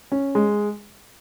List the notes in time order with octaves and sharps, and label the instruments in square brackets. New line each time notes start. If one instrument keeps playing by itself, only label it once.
[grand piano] C#4
G#3